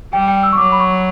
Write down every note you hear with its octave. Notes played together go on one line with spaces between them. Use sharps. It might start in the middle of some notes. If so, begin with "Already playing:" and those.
G3 G5
G5
E6
C#6
F#3 D6
B5
C#6